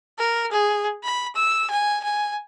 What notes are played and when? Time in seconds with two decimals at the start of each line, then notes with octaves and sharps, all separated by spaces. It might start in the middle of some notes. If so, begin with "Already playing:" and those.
0.19 A#4
0.52 G#4
1.04 B5
1.35 E6
1.70 G#5
2.03 G#5